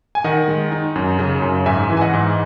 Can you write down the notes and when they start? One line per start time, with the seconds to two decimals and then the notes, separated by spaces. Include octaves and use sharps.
0.15 G#5
0.24 D#3 D#5 F#5
0.48 G#3
0.72 D#4
0.96 F#2
1.19 C#3
1.42 F#2
1.66 G#2 E5 G#5
1.90 E3
1.97 G#5
2.01 D#5 F#5
2.14 G#2